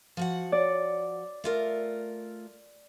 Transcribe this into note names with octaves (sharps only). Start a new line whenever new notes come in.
F3 F#4 F#5
D5
A3 F4 A#4